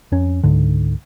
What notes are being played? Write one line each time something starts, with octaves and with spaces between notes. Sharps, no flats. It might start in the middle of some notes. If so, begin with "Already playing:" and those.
F2 C#4
C#2 G#2 D3